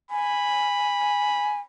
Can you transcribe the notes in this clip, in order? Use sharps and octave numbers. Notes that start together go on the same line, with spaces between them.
G#5 B5